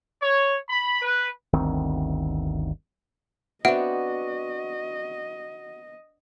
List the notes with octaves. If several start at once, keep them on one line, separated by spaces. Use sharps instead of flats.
C#5
B5
B4
G1 D2 D#3 C4
B3 C4 D4 F#4 D#5 E5 F#5 D7